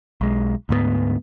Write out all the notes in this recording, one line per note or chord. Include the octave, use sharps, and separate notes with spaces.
B1 G#3
D2 G#2 G#3 B3